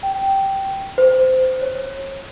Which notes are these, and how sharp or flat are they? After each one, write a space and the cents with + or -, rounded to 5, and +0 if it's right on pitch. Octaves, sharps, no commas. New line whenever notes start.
G5 -10
C5 -20
C#5 -30